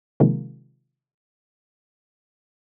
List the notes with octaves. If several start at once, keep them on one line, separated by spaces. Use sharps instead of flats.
C3 D#3 F3 G#3 A#3